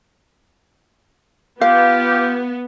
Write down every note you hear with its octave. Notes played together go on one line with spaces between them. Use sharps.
B3 F4 G4 F5